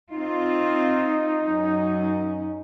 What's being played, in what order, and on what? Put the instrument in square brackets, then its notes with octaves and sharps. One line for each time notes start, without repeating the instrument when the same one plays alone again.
[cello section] C4 F4 [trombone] D#4
[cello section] F#2 C#4